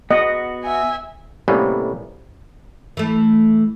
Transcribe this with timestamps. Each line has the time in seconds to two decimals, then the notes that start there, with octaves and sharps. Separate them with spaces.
0.11 B3 F#4 D#5
0.64 E5 G#5
1.48 A2 C3 G3 A#3 B3 C#4
2.97 E3 A3